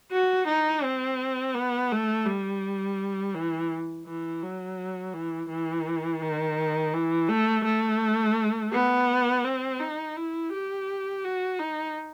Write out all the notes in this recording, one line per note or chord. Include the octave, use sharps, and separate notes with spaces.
F#4
D#4
C4
B3
A3
G3
E3
E3
F#3
E3
E3
D#3
E3
A3
A3
B3
C4
D#4
E4
G4
F#4
D#4